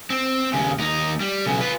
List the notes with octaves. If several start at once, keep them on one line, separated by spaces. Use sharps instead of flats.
C4
D#2 C#3
D#2 D#4
G3
B1 C#3
F4 B4